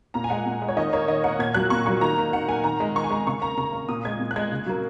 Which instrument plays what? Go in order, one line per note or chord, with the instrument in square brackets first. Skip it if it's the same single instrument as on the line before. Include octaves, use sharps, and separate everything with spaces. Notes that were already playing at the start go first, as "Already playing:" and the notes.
[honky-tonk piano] A#2 A#5
G#5
G#3 F#5
A#2
G#3
C#5
D#3 D#5
A#3 C#5
D#3 D#5
A#3 F#5
A#2 G#6
F#3 A#3 F#6
A#2 C#6
F#3 A#3 C#6
D#3 A#5
A#3
D#3 F#5
A#3 G#5
D#3 A#5
G#3
D#3 C#6
G#5
G#3 A#5
C#3 C#6
A#3 A#5
C#3 A#5
A#3
A#2 D#6
G#3 G#6
A#2
F#6
G#3 G#6
C#3
F#3 A#3